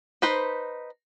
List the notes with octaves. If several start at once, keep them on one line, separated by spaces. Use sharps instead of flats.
D#4 B4 C5